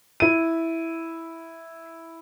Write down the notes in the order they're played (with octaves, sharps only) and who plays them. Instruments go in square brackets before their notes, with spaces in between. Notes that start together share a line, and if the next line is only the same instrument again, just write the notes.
[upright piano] E4 D#7